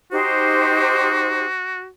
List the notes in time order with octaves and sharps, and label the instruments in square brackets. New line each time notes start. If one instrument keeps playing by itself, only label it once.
[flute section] D#4 G4 C5 [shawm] F#4